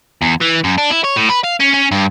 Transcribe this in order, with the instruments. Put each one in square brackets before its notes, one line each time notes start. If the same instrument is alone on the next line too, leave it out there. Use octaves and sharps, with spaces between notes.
[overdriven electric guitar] E2
E3
F#2
D4
E4
C#5
A2
B4
F5
C#4
C#4
G2